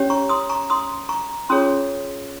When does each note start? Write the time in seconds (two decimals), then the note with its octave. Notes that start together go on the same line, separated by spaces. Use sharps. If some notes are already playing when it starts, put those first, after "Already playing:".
Already playing: C#4 G4 C#5
0.10 A#5 C#6
0.29 C6 D#6
0.49 A#5 C#6
0.70 C6 D#6
1.09 A#5 C#6
1.49 C#4 F4 G#4 C#5 C6 D#6